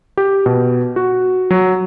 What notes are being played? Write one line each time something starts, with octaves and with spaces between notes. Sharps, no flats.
G4
B2
F#4
F#3